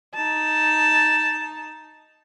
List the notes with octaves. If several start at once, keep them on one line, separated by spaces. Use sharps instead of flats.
D#4 A5